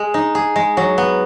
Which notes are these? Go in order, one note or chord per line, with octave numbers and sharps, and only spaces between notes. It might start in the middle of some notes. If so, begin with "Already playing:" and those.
Already playing: G#3 G#4
D#4
G#4
G#3
F#3
B3